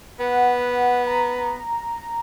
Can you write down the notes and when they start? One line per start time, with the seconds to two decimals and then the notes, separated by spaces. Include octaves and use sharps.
0.19 B3 F#5
1.07 A#5